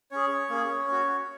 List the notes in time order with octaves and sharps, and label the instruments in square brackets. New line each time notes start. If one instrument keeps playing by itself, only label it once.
[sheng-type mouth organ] C#4 G#4 C#5
A#3 C#4 G#4
C#4 F#4